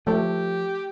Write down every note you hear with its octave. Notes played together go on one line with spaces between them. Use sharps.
F3 A3 G4